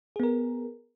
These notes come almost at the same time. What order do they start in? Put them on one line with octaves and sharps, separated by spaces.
G#4 B3 A#4